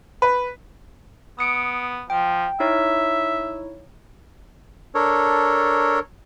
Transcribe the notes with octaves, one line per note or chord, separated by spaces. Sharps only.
B4
B3 D#6 C#7 D7
F3 G5
D#4 E4 C#5 E5
D4 A4 A#4 C#5